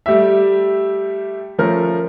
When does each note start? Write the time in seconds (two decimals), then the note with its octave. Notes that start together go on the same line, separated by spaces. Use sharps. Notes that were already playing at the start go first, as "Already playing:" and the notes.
0.06 G3 A3 G4 E5
1.58 F3 A3 C#4 A#4